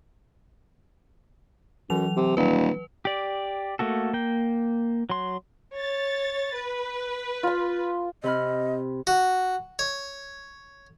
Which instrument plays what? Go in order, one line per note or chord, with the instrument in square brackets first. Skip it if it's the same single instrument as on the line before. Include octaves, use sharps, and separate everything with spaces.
[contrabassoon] F#2 [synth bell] E3 F#3 F7
[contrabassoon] C3
[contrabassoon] D#1 [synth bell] B4
[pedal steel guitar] G4 D5
A3 A#3 F#4 A4
A#3 G5
F#3 C6
[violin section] C#5 A6
B4
[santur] F4 C6
[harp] C3 B5 F6 [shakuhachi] D#5
[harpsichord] F#4
C#5